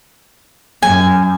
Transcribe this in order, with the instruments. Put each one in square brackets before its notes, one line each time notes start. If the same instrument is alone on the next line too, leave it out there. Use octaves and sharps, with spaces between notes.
[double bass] F#2 [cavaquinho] G#5